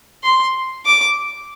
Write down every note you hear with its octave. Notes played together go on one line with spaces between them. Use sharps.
C6
D6